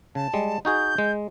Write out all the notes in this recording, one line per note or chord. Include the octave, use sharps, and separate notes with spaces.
C#3 A5
G3 G#3
D#4 F#4 G#4 G6
G#3